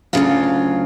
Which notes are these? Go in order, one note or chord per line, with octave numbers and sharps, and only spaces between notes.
D2 C#3 F#3 F4